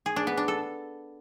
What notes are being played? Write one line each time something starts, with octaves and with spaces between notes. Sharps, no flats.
G#4
D4
B3
D4
A4